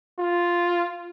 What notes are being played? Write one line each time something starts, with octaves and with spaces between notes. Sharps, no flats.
F4